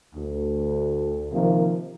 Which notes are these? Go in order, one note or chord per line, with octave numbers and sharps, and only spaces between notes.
D2
C3 D#3 F3 A#3